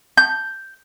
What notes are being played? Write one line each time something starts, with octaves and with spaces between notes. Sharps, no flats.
G6